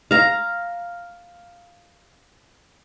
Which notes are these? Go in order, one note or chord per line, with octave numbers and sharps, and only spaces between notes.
F5 A#5